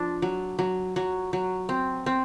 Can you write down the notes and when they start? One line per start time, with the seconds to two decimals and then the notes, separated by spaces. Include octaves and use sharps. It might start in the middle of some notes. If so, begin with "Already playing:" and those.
Already playing: F3 D4
0.22 F#3
0.59 F#3
0.96 F#3
1.33 F#3
1.69 C4
2.06 C4